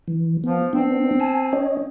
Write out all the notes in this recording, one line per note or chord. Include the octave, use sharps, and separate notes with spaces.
E3
F3 B3
B3 C4 D4
G#5 A5
C#4 C#5 D#5